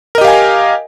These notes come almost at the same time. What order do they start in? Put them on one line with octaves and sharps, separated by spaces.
A#4 D#5 G4 F5 G#5